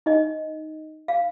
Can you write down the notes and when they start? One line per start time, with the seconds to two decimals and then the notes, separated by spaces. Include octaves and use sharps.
0.06 D#4 D#5
1.08 F5